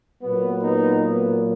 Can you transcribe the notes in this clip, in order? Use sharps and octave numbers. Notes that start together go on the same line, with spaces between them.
A#2 F#3 A#3 B3
B3 D#4
B3